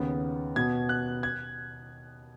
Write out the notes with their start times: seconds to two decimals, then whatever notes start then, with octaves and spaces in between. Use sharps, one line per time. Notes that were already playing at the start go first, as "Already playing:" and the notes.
Already playing: D#2 C#3 B3
0.56 B2 B3 G#6
0.89 F#6
1.23 G#6